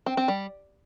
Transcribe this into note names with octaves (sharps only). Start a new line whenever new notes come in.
C4
C4
G3